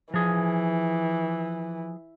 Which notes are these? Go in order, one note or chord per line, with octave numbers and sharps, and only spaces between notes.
E3 F3 G#4